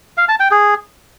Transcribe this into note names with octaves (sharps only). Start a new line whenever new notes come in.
F5
A5
G5
G#4